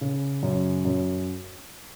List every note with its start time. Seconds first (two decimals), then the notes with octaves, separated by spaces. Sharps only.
0.01 C#3
0.43 F#2
0.85 F#2